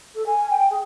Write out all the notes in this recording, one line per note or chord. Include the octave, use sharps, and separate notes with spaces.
A4
G#5
G5
G#4